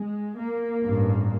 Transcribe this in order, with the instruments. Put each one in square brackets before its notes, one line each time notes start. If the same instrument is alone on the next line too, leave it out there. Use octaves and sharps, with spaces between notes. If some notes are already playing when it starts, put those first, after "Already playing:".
Already playing: [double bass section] G#3
A#3
A1 G2